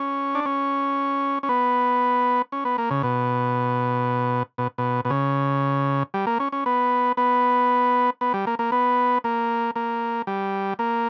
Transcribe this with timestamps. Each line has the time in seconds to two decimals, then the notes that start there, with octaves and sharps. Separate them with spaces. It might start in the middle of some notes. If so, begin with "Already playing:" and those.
Already playing: C#4
0.35 D4
0.46 C#4
1.43 C#4
1.49 B3
2.52 C#4
2.65 B3
2.78 A#3
2.91 C#3
3.03 B2
4.58 B2
4.78 B2
5.05 B2
5.10 C#3
6.14 G3
6.27 A#3
6.40 C#4
6.52 C#4
6.66 B3
7.17 B3
8.21 B3
8.34 G3
8.47 A#3
8.59 A#3
8.72 B3
9.24 A#3
9.76 A#3
10.27 G3
10.79 A#3